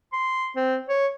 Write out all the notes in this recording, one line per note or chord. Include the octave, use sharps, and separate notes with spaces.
C6
C4
C#5